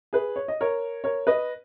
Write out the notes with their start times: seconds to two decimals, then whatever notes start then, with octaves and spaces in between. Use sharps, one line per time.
0.13 G#4 B4
0.36 C#5
0.48 D#5
0.61 A#4 C#5
1.04 A#4 C#5
1.27 B4 D#5